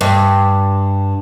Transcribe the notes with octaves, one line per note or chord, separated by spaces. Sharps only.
G2